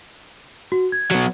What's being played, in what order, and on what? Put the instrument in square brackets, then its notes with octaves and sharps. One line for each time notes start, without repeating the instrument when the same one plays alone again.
[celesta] F#4
G#6
[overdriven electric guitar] F#3 B3